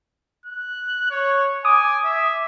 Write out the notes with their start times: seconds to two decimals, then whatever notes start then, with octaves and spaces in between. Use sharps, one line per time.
0.46 F#6
1.11 C#5
1.65 G#5 D6 D#6
2.05 E5